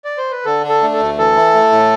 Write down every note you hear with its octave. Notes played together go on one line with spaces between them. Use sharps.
D5
C5
B4
D3 A4
D4
A4
A3
A4
D2
E3 A4
E4
A3
A2